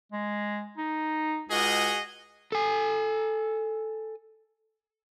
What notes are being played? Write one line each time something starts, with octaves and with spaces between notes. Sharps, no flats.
G#3
D#4
C#2 F#4 G#4 D#5
A4 G#5